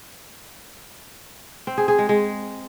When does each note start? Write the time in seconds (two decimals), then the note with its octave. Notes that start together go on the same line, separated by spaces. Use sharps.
1.67 C4
1.78 G#4
1.88 G#4
1.99 G#3
2.09 G#3